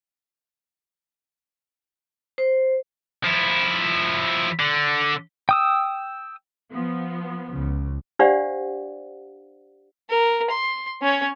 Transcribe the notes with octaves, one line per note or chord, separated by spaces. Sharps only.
C5
F3 E4
D3
G5 D#6 E6
F3 B3
C#2 C#3
D4 G4 C5 D5 F5 F#5
A#4
C6
C#4 C#5